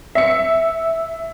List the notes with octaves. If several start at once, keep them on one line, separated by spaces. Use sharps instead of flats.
E5 C#7